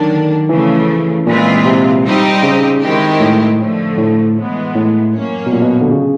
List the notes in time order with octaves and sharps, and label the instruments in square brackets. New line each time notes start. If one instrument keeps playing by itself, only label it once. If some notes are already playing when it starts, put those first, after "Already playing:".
Already playing: [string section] D3 F#3 A#3 D4 [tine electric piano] D#3
[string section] C#3 F3 A3 [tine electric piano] E3
[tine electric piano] A#2 [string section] E3 G#3 C4 F4
[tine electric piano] C3
[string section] G3 C4 D#4 G4
[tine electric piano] C#3
[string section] D#3 G#3 C4 E4 G4
[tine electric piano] A2
[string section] D3 F3 A3
[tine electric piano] A2
[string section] E3 G#3 B3
[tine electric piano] A2
[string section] F#3 A#3 C#4
[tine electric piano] B2
A#2
B2
D3
C#3